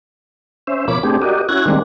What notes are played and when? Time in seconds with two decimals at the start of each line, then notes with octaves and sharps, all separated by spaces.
0.67 C#4 C5 E5
0.88 B2 F3 A#4 C#5 B5 D6
1.03 A3 C4 D4 G4 G#4
1.22 F#4 G4 A#4 D5 D#5
1.49 C#4 E4 F#4 F#6 G#6 A#6
1.66 D#3 G3 G#3 A#3 C4 D4